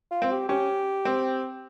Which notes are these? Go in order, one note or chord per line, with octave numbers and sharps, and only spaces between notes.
F4
C4
G4
C#4 G4
C4